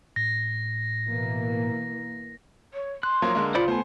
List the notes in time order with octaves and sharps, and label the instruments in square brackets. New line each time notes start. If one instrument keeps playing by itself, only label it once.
[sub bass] A2 [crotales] A#6
[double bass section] B2 E3 A#3
[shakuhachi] C#5
[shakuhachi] C6 [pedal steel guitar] F#6
[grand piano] F3 F#3 A#3
D3 G#3 A#3
[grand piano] C#2 C#7 [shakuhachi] F4 [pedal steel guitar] C5 D5 B5
[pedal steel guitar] A3 B3 [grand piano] C5 G#5